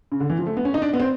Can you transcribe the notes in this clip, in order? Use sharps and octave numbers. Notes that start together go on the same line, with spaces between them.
C#3
D3
E3
F3
A3
B3
C#4
D#4
D4
B3
C4